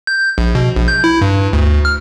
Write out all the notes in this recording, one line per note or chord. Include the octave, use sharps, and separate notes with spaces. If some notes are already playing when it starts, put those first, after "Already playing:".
G6
A#1
B2
A#1
G6
E4
G2
D2
F6